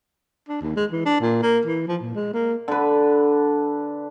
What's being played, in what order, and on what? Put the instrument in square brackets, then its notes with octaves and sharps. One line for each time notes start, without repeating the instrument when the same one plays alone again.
[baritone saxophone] D4
D#2
G#3
E3
D4
A#2
A#3
E3
F3
A#2
G#3
A#3
[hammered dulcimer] D3 B4